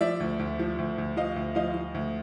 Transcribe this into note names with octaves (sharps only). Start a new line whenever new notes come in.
F3 D5 E5
D2
D2
F3
D2
D2
F3 D#5 F5
D2
F3 D#5 F5
F3
D2